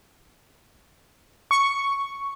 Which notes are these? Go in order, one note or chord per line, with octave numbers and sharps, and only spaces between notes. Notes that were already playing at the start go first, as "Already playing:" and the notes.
C#6